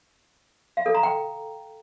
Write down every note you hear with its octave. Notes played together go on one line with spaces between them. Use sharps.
F5
A4
A#5
G5